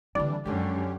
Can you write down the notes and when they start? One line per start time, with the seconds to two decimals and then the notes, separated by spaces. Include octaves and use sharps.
0.15 D3 E3 G3 C4 D4 D5
0.45 F#2 D3 F3 G#3 C#4 G4